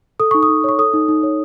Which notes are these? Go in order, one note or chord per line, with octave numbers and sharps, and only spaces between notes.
A4 D#6
D#4 C#6
D#6
D#4
C#5 C#6
A4 D#6
D#4
D#4
C#5